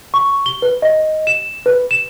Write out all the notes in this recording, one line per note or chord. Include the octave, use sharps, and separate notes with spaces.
C#6
G7
B4
D#5
E7
B4
E7